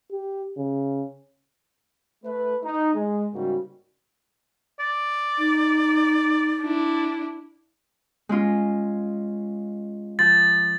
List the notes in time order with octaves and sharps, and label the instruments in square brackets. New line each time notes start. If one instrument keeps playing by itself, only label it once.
[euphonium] G4
C#3
[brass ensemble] A3 B4
D#4
G#3
G#2 C#3 G3 A#3 F#4
[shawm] D5
[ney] D#4
[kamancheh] D4 E4
[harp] G#3 C#4 F4
[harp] F3 [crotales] A6